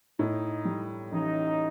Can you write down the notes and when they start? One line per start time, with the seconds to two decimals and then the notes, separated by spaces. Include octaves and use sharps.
0.19 A2 D#4
0.65 G3
1.13 A1 D#4